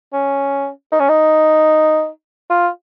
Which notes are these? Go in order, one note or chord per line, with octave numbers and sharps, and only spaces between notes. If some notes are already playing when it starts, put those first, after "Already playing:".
C#4
D#4
C#4
D#4
F4